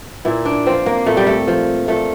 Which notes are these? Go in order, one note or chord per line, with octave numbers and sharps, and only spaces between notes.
A#2 E4
D4
F3 C4
A#3
A#2 A3
G3
A3
F3
A#2 A3